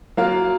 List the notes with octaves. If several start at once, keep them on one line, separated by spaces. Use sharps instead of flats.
F#3 A#3 F4 A#4 F5